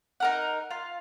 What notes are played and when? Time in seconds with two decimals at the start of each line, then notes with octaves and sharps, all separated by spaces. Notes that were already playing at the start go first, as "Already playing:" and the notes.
0.20 D#4 A#4 F#5
0.71 F4